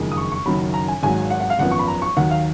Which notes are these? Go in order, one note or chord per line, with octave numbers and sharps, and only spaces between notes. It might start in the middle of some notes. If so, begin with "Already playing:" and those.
Already playing: F#1 F2 D#3 G#3
D#6
C#6
C#6
F#1 F#2 D#3 F#3 B5
A#5
G#5
G#1 G#2 F#3 G#5
F#5
F#5
F5
G#1 F#2 F3 B3 F#5
C#6
B5
A#5
C#6
D#2 D#3 F#3 F#5
F5